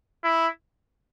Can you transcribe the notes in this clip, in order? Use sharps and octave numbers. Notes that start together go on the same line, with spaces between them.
E4